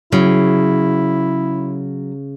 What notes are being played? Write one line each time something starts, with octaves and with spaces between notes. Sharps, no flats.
C#3 F#3 E4